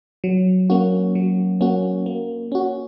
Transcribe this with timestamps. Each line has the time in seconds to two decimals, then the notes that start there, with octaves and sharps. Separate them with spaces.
0.24 F#3
0.70 A#3 C#4 F#4
1.15 F#3
1.61 A#3 C#4 F#4
2.06 A#3
2.52 C#4 F#4